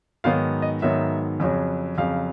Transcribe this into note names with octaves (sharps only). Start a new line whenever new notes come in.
G#2 D#3 F#3 B3 F5
D#5
G#2 D#3 F#3 B3 E5
F2 C#3 F#3
F2 C#3 F#3 F5